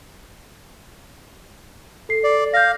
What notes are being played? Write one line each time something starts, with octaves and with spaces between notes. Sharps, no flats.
A4 C7
D5
F5 G6 A#6